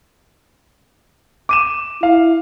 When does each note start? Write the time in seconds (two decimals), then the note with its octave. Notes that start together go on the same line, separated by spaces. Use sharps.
1.49 D6 D#7 E7
2.03 E4 F5